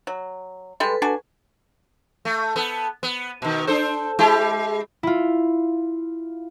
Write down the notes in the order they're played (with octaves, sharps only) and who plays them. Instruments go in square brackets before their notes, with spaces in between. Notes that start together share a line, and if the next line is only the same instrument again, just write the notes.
[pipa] F#3
[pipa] G3 G#3 [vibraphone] A4 B4
[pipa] D4 F#4 G#5
[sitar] A3
B3 A4
B3
B2 D#3
D4 A4 C5
G#3 E4 G4
[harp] E4 F4